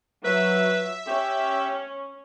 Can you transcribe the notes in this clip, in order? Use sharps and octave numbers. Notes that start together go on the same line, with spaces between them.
F#3 B4 E5
C#4 G4